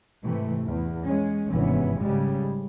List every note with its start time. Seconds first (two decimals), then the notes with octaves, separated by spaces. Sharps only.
0.24 G#2 C3 E3 A3
0.66 E2
1.06 G#3 C#4
1.50 G#1 G2 C3 E3 B3 C#4
2.00 G#2 C#3 G3 G#3